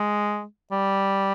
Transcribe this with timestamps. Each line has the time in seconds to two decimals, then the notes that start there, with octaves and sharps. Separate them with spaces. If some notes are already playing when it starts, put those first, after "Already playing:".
Already playing: G#3
0.72 G3